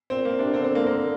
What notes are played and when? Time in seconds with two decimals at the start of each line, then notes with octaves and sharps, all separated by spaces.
0.10 A#2 C4
0.25 A#3
0.39 C3 D4
0.54 D3 C4
0.64 C4
0.75 A#3
0.87 A#3